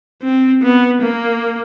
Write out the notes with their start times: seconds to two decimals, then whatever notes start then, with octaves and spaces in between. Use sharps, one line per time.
0.22 C4
0.62 B3
1.02 A#3